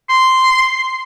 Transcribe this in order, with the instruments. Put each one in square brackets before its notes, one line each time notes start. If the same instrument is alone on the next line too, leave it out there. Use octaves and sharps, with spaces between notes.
[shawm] C6